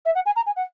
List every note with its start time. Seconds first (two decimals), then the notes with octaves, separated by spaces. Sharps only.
0.05 E5
0.15 F#5
0.26 G#5
0.36 A#5
0.46 G#5
0.56 F#5